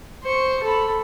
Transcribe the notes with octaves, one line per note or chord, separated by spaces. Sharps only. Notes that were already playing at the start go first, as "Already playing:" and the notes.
C5 C#6
A4 B5